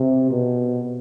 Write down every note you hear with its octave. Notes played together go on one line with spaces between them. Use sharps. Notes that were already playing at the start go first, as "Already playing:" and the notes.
Already playing: C3
B2